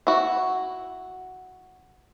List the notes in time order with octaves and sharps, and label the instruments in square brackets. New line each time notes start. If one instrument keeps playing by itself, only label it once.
[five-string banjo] E4 F#4